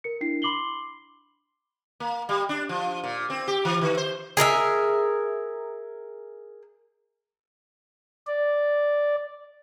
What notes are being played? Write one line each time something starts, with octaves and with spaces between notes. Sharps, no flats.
A#4 C#7
D4 E4 C7
B5 C6 D6 C7 F#7 G7
A#3
G3
D4
F3
A#2
C4
G4
E3
D#3
C5
G#4 A#4 D#5 E5
D5